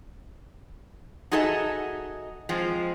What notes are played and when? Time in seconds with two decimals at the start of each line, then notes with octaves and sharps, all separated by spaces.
1.32 D#4 F#4 G#4 A4 D#5 E5
2.49 F3 G#3 C4